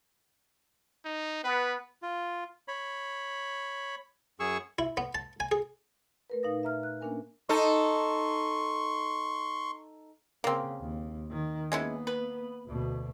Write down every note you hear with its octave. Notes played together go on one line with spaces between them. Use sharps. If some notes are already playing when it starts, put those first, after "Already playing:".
D#4
B3 B4
F4
C#5 B5
F#2 G#4 C#6 E6
E4
B3
A5
G#5
G#4
A3 A#4 B4
A#2 D#4 F5 D#6 A#6
E5 A#5 F6
F#6
A#3 C#4 D4 A#4 G#5
D#4 A4 C6 C#6
C#3 A#3 C4
D#2
D#3
G#3 A#3 B3 C#4 E4
B4
D2 B2